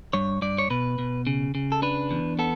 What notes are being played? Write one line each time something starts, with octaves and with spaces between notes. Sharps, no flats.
G2 C#5
G2 D5
C#5
B2 B4
B2
C#3
C#3
A4
D4 B4
E2
B3 A4